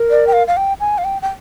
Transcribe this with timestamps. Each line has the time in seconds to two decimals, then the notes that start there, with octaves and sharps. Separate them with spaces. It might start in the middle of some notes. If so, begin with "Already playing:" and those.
Already playing: A#4
0.11 D5
0.27 G5
0.33 F5
0.47 F5
0.57 G5
0.80 G#5
0.98 F5
1.04 G5
1.22 G5